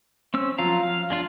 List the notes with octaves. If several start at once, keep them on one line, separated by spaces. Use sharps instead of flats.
C4 C#4 E6
F3 F#3 F4 F5 A#5
F5
G#3 D4 F4